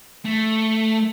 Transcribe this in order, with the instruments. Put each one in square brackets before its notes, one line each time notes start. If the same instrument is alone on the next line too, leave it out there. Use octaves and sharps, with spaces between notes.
[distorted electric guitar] A3